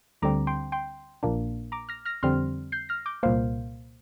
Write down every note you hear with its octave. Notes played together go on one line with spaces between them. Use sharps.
D2 D3 G3 C4 A#5 D6
G5 C6
G5 C6
A#1 A#2 A#3 D4
A#5 D6
F6 A#6
F6 A#6
F2 D3 G3 C4 C6 F6
G6 C7
F6 A#6
D6 G6
C2 A#2 A#3 C5 F5